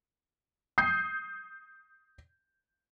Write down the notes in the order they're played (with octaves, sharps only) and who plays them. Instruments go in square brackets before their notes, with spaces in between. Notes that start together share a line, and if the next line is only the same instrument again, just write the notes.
[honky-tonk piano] D#6 G6 C7